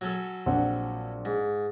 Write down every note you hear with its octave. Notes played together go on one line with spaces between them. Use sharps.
F#3 C#4 A4
A#1 C4 F#5
G#2